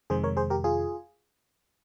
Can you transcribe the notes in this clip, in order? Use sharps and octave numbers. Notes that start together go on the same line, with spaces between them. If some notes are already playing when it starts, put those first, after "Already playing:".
F2 C3 D#3 G#3 G#4 C5
A#4 C#5
G#4 C5
G4 A#4
F4 G#4